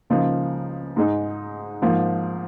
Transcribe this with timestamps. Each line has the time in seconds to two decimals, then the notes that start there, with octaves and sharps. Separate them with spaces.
0.10 C#2 C#3 F3 A#3 D#4
0.96 G#2 G#3 D#4
1.82 G#2 F3 A#3